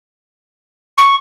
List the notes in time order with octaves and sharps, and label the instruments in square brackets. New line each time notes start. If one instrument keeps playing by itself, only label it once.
[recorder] C#6